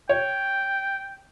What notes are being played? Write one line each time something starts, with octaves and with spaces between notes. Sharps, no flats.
C#5 G5